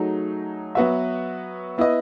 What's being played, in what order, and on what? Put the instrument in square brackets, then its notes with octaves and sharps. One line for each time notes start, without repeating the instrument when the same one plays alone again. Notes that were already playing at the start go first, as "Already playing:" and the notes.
Already playing: [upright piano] F#3 A3 D#4 G#4
F#3 B3 F#4 B4 E5
B3 E4 B4 D#5